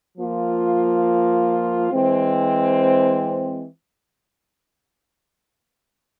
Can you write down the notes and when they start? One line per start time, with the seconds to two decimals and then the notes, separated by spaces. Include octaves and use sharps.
0.16 F3 A#3 F4
1.92 E3 G#3 C4